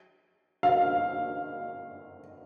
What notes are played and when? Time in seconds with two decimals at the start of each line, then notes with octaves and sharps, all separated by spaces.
0.63 F5